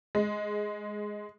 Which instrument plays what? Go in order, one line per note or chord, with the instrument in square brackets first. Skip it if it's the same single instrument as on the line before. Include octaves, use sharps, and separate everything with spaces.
[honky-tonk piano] G#3